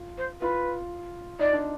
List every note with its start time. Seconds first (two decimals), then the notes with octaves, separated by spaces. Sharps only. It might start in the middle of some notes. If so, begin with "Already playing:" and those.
Already playing: F4
0.18 C5
0.41 F4 B4
1.39 D#4 D5
1.53 D4